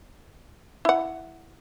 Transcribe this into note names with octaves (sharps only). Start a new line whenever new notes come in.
E4 F#5